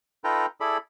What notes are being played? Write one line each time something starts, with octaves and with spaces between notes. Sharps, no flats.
D#4 F4 A4 B4 G5 A#5
E4 G#4 A4 D5 B5